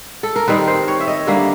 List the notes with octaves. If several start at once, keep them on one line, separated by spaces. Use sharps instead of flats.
A4
A#4
D#3 G3 C4 D#4 B4
C5
C#5
E5
D#5
D3 G3 A#3 E5